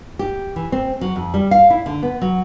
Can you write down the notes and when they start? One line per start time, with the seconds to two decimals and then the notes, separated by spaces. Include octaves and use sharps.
0.19 G4
0.56 E3
0.72 C4
1.01 F#3
1.16 F2
1.34 G3
1.51 F5
1.70 E4
1.86 D3
2.03 B3
2.21 F#3